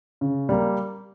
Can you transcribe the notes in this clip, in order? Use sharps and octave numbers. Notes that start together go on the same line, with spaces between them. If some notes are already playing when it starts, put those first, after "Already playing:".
C#3
G3 A#3